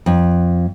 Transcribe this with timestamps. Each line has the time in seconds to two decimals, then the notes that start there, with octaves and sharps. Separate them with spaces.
0.06 F2